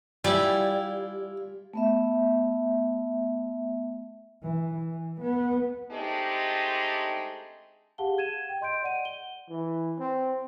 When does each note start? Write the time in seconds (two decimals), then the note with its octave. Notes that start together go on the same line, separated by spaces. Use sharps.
0.24 G3 E4 F4 D5 G#5
1.74 A3 B3 E5
4.43 E3
4.74 E3
5.21 B3
5.91 G#3 A3 C4 D4 D#4 G4
7.98 G4 G#4 F5 F#5 A5 G7
8.18 G#6 D#7 E7
8.49 G5
8.61 D#5 C6 G6 D7
8.82 D5 F#5 D#7
9.05 G7
9.49 E3
9.99 C4